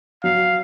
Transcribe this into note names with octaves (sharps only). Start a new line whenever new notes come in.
F#3 F5